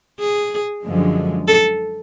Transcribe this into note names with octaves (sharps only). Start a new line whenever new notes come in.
G#4
F#2 D3 F3 G#3
A4